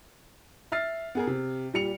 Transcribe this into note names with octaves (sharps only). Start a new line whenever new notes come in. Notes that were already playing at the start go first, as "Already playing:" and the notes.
E5 F6 A6 C7
B3 G#4 A#4
C3
A#2 G3 C#7 F7